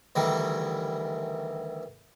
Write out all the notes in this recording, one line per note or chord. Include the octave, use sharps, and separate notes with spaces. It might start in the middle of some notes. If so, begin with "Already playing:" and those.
D2 D#3 E3 G3